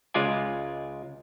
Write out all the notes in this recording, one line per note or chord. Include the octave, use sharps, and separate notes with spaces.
C#2 G#3 F4 D5 G#5